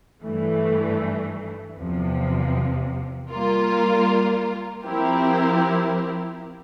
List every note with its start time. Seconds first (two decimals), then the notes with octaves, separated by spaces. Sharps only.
0.23 G2 E3 A3
1.77 E2 C3 F3
3.31 G3 A#3 F4 A#4
4.85 F3 C4 E4 G4 A#4